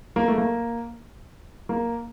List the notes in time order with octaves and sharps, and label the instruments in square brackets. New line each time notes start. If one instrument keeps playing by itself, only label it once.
[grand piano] A#3
A3
A#3
A#3